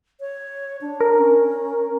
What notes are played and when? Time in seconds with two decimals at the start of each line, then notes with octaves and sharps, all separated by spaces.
0.20 C#5
0.81 D4
1.00 A#4
1.18 C#4